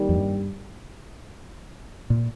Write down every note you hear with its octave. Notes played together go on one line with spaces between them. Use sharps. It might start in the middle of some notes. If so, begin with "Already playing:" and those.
Already playing: D#2 D#3 G3
F2
G2
A#2